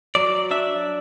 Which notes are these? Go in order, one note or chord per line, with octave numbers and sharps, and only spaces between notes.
F#3 D5
D4 E5